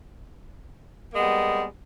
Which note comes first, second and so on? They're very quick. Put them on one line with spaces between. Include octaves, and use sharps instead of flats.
A#3 G#3 B3 G3